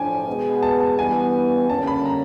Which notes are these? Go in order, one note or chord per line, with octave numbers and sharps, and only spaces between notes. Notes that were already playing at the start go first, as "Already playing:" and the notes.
Already playing: A2 F3 D4 G5 G#5
B2 G#3 B3
A5
A5
G2 E3 G3 B3 E4 G#5
D3 G3 A#3 C#4 A5
B5
A#5